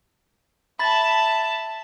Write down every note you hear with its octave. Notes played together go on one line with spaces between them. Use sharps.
E5 A5 B5 A6